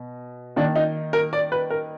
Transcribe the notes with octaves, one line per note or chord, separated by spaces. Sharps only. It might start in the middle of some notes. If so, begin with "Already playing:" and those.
Already playing: B2
D#3 A#3 D4
D#4
A#4
D5
B4
A#4